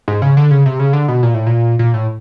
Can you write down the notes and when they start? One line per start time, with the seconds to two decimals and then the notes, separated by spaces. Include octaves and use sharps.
0.08 G#2
0.22 C#3
0.37 D3
0.51 C#3
0.66 C3
0.79 C#3
0.93 D3
1.08 B2
1.23 A#2
1.34 A2
1.46 A#2
1.79 A#2
1.94 A2